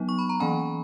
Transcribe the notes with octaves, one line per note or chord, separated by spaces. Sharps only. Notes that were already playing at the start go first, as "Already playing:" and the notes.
Already playing: F#3 B3 D#4
C#6
B5
A#5
E3 A#3 C#4 G#5 B5